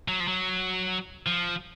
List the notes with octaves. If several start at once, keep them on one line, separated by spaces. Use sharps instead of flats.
F#3
F3
F#3
F3